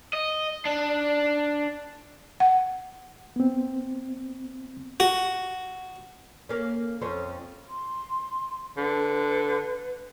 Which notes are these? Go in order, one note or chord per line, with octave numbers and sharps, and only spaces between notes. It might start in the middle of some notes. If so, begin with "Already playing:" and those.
D#5
D4
F#5
B3 C4
F#4
A#3 C#4
F2 C#4 C5
C6
D3 B4